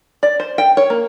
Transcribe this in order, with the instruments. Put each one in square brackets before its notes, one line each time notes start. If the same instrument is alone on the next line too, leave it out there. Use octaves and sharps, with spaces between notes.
[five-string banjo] D5
C5
G5
C#5
A#3